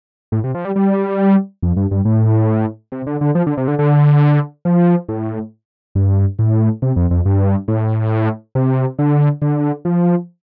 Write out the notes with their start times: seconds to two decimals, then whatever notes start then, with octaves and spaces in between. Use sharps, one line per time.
0.32 A2
0.44 C3
0.55 F3
0.65 G3
0.76 G3
1.63 F2
1.76 G2
1.91 G2
2.05 A2
2.92 C3
3.07 D3
3.21 D3
3.35 F3
3.47 D3
3.57 C3
3.68 D3
3.79 D3
4.65 F3
5.09 A2
5.95 G2
6.39 A2
6.82 C3
6.96 F2
7.11 F2
7.25 G2
7.68 A2
8.55 C3
8.99 D3
9.42 D3
9.85 F3